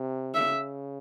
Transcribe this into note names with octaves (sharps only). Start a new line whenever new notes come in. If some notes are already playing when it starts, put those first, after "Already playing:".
Already playing: C3
C#3 E5